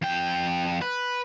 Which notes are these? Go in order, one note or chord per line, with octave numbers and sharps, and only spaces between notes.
F2 G5
B4